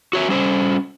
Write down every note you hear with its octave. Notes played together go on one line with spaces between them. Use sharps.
F#4 C#5 E5
G3 C#4 C5